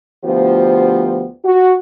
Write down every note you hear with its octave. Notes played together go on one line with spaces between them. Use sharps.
D2 F3 B3 F4 G4 C5
F#4